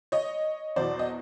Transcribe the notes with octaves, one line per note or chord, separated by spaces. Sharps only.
C#5 D#5
E2 B2 F#3 C5 D5
D#5